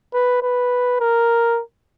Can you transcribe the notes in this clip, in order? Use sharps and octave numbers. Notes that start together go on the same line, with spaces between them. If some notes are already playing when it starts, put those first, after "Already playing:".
B4
B4
A#4